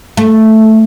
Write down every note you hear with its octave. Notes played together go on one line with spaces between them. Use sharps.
A3